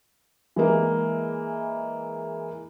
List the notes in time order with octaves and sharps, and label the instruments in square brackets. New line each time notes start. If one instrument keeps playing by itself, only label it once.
[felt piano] E3 G#3 A#3